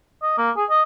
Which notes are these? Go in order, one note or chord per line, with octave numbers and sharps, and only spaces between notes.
D#5
A#3
G#4
D#5